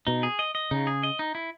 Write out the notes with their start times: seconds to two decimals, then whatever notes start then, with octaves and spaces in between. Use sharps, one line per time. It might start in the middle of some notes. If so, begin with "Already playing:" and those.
0.07 B2 D#4
0.23 G#4
0.39 D#5
0.55 D#5
0.71 C#3 D#4
0.87 G#4
1.03 D#5
1.19 D#4
1.35 E4